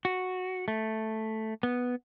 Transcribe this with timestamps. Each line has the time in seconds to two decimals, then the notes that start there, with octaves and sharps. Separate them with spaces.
0.05 F#4
0.68 A3
1.63 B3